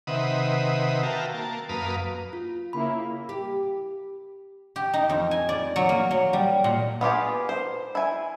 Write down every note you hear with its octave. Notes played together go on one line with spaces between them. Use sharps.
C3 D#3 B4 E5 F#5 D#6
F#4 A#4 E5 F5 G5 A5
A#3 A5
F#2 A#3 B4 F5 D#6
F4
C#3 A#3 E4 B5
G4
G4
D#4
F2
G#5
D5
F#3
A#3
F#3
G3
A#2
B3 F4 G4 G#4
C5
E4 G#5